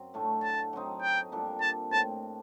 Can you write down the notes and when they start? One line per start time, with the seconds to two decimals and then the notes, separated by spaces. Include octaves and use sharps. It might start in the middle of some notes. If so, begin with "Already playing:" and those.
Already playing: F#2 F#3 C4
0.14 A2 A3 D4 A4
0.43 A5
0.73 F#3 C4 D#4
1.02 G5
1.32 A#2 G3 D4 A4
1.61 A5
1.91 A2 G3 C4 A5